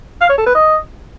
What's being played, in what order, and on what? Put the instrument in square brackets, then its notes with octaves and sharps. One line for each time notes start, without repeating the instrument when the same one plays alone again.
[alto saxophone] F5
C#5
A4
B4
D#5